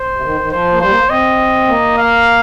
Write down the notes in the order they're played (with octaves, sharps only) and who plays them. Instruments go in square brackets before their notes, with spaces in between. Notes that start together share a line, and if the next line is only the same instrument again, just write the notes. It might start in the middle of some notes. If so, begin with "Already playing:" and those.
Already playing: [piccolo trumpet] C5
[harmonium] C3
D#3
D#3
[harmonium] F3 [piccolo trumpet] C5
[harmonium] A#3
[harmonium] G3 [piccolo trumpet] C5
[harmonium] A#3
[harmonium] C4 [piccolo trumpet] D#5
[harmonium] A#3
[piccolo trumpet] F5